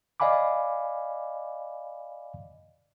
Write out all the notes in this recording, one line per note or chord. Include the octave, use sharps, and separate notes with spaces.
D5 D#5 F5 G#5 B5 D6